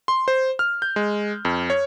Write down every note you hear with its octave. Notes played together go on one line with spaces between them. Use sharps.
C6
C5
F6
G6
G#3
F2
C#5